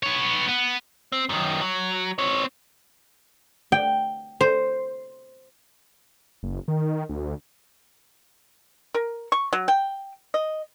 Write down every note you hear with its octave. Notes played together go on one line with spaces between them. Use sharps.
B3 C#5
B3
C4
F#2 D#3
F#3
C4 C#5
G5
C5
F#1
D#3
D2
A#4
C#6
F#3
G5
D#5